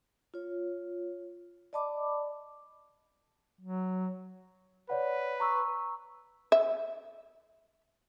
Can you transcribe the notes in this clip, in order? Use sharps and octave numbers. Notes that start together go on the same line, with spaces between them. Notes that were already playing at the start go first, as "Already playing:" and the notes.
F4 C#5
D5 D#5 A5 B5 D6
F#3
B4 C#5 D5 F#5
A#5 C#6 E6
E5